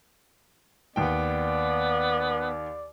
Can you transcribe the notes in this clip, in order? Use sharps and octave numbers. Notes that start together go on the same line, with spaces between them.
D#2 B3 D5 G5